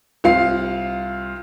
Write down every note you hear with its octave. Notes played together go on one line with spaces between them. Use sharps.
C2 F4 F5 C7